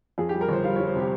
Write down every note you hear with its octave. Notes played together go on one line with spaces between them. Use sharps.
F2 G#4
G3 G4
A#4
G1 C5
G3 F5
G3 C#5
C5
C3 G4